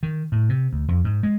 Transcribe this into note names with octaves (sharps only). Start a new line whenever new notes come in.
D#3
A2
C3
D2
F2
G#2
G#3